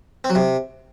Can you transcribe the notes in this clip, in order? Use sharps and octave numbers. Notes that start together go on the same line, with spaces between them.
C4
F#3
C3